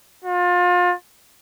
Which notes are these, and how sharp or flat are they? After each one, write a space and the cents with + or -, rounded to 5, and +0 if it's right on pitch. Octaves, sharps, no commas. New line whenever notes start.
F4 +30